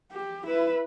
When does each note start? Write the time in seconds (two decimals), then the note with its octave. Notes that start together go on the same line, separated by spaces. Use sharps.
0.12 G4
0.46 E4 B4